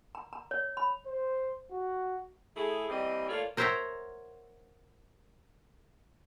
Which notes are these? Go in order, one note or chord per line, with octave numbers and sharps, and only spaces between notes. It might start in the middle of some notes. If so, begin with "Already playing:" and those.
A#5
A#5
C#5
B5
C5
F#4
A3 E4 G#4
E3 G3 A#3 C4 D#5
A3 A#3 F4 C#5 D5
A#4 C5 C#5 E5 F#5 A#5